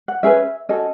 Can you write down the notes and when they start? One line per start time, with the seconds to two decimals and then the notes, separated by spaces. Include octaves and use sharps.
0.08 F#5
0.23 C#4 G#4 B4 E5
0.69 C#4 F#4 A4 D#5